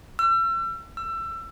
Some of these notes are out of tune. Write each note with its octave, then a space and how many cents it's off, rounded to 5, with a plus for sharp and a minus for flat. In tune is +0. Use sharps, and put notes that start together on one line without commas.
E6 +40
E6 +25